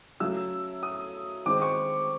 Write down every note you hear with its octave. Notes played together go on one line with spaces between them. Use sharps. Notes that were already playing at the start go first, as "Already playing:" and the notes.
C#3 F#3 A3 E6
D#6
D#3 G#3 C4 D6
C#6